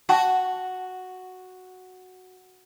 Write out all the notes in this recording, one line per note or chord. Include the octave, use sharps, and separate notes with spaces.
F#4 F#5 G5 A5